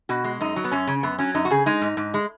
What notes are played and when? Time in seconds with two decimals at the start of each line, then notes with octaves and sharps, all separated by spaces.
0.09 B2 F#4
0.24 G#3
0.41 F#2 D#4
0.56 F#3
0.64 B3
0.71 F#2 C#4
0.87 C#3
1.03 F#2 B3
1.19 F#3 C#4
1.35 F#2 D#4
1.45 F#4
1.51 C#3 G#4
1.66 G#3 D#4
1.82 G#2
1.97 G#2
2.14 G#3